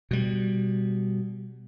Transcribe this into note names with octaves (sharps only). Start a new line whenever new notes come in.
B2 G3